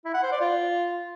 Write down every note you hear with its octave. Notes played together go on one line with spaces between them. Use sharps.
E4
F#5
C5
D5
F4